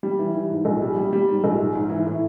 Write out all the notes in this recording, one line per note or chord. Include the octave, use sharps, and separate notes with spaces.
G3
E3
E3
G#2
A#1
G3
G3
G3
G#2
A#1
G#2
G#2
E3
A2